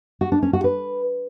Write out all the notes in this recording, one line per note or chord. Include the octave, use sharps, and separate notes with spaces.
F#4
D4
C#4
F#4
B4